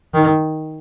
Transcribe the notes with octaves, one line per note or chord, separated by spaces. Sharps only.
D#3